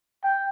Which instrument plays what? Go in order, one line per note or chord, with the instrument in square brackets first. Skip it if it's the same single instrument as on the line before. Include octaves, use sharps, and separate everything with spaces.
[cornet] G5